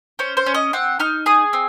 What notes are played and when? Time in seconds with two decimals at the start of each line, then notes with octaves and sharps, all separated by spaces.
0.19 C#4 C5
0.37 C5
0.46 C#4
0.54 D#5
0.73 C4 F#5
1.00 D#4 F6
1.26 G#4 D#6
1.53 C4